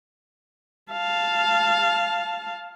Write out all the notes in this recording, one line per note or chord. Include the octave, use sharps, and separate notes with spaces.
F5 A5